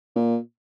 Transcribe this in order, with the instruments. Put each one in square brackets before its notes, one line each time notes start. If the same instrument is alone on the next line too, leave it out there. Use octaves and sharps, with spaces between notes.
[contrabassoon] A#2